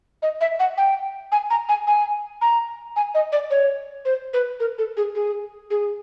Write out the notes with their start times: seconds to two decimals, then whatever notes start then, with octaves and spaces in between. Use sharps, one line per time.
0.22 D#5
0.41 E5
0.60 F#5
0.77 G5
1.32 G#5
1.50 A#5
1.69 G#5
1.87 G#5
2.41 A#5
2.96 G#5
3.15 D#5
3.32 D5
3.51 C#5
4.05 C5
4.34 B4
4.60 A#4
4.78 A4
4.97 G#4
5.15 G#4
5.71 G#4